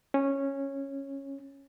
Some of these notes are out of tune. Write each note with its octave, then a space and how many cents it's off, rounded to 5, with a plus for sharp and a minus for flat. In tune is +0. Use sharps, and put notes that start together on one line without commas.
C#4 -10